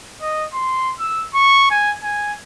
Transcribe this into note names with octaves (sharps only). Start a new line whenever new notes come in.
D#5
C6
E6
C#6
G#5
G#5